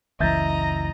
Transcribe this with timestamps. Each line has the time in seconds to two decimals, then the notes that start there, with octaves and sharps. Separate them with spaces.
0.20 F#1 C#2 E3 D#5 E5 A#5 G6 A6